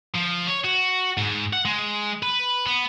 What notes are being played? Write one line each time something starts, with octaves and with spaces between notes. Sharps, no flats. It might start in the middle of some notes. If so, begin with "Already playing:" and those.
F3
C#5
F#4
G#2
F#5
G#3
B4
B3